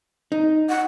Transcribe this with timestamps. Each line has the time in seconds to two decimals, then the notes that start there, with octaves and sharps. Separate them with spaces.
0.32 D#4
0.69 F#5